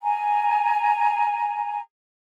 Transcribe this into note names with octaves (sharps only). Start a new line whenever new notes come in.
G#5 A#5